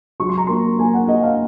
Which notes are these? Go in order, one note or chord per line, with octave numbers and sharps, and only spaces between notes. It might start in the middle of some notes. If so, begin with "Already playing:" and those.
F#3 C#6
C6
A#5
A#3 C6
A#3 G#5
F#5
A#3 D#5
F5